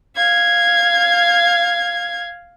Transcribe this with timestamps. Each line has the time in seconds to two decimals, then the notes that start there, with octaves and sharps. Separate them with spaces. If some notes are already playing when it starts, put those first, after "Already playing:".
0.16 F5 G#6